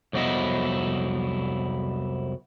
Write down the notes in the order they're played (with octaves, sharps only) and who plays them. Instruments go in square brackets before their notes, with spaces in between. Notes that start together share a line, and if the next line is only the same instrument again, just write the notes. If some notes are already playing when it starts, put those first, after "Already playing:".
[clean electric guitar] C2 F2 F#3 B3 E4 D#5